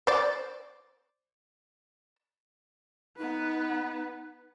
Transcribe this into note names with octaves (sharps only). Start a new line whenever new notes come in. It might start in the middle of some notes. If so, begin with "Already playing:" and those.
C5 D5
B3 D#4 B4